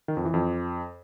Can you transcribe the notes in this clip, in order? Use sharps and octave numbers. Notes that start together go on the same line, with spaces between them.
D#3
F2
E3
F2